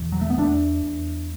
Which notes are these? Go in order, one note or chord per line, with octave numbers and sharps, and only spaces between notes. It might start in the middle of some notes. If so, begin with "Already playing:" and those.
Already playing: E2 B2 E3
F#3
A3
B3
E2 A3 D4
E2